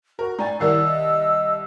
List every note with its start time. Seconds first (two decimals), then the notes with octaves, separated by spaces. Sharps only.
0.19 F#4 A#4
0.39 A2 D5 G#5 A#5 A6
0.60 C2 D#3 E4 A#4 D5 F#5 E6 C7
0.83 D#5